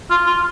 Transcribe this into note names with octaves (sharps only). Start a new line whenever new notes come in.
F4
F4